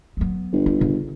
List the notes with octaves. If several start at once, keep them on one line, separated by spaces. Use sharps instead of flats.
F#3 B3
G1
E4
C#3